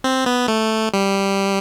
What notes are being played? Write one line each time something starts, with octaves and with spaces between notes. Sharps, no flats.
C4
B3
A3
G3